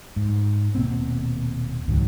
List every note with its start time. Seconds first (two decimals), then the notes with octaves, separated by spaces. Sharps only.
0.16 G#2
0.75 D#1 B2 A#3 C4
1.88 C#2 G#2 D#3 F#3